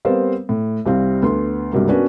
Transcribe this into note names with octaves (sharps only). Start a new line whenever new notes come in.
G3 B3 C4 A#4 C5 F5
A2
C2 G3 C4 F5
D2 B3 C6
C#2 G2 C3 F#3 A#3
B3 C#4 D4 F#4 A#4 B4